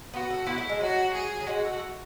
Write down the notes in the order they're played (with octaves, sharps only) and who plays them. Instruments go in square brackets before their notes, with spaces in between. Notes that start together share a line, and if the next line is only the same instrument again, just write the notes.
[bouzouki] B3 [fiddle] F#4
[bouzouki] A3
[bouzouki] B3 [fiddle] E4
[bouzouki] A3
G#3
[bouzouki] F#3 [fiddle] F#4
[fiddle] G#4
[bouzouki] F#3
[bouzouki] G#3 [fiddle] F#4
[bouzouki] A3